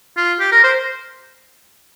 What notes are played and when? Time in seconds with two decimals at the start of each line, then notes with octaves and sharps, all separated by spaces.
0.17 F4
0.40 G4
0.52 A#4
0.63 C5